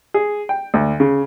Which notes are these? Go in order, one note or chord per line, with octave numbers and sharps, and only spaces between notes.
G#4
G5
D2
C#3